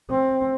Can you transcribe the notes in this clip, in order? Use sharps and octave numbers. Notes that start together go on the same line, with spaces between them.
C4